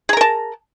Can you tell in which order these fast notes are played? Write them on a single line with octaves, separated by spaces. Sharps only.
G#4 A#5 A#4 A5